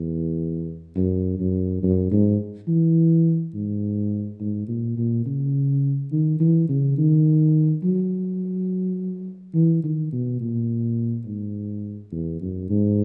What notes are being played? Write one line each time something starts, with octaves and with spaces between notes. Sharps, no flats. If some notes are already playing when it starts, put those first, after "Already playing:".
Already playing: E2
F#2
F#2
F#2
G#2
E3
G#2
G#2
A#2
A#2
C#3
D#3
E3
C#3
D#3
F#3
E3
D#3
B2
A#2
G#2
E2
F#2
G#2